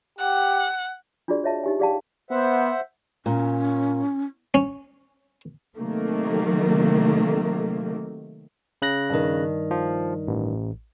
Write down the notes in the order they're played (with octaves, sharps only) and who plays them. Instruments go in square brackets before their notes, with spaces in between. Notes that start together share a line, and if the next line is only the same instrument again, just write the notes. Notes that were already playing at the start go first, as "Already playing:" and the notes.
[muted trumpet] G4 [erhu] F#5
[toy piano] D4 F4 F#4 G#4 D5
C#5 D#5 E5 A5
D#4 G4 G#5
G4 G#4 D5 F5 G5 A5
[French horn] B3 [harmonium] C5 E5 F#5
[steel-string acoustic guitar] A#2 [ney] C#4
[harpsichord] C#4
[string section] C3 D#3 F#3 A3 A#3
[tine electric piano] C#3 F#6 A#6
[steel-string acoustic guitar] G2 D#3
[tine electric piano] F3
A1